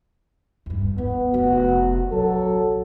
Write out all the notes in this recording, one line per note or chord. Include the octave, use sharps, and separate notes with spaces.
E2 G2
E3 B3
F1 F#4
A#1 F#3 A4